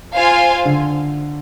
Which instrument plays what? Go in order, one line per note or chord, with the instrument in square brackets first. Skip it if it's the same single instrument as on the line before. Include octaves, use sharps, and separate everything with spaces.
[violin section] F4 C5 F5 G#5
[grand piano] D3